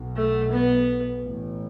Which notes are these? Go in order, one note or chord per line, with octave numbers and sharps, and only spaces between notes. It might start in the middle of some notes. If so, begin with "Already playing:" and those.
Already playing: B1 B2
A3
B3
A1 A2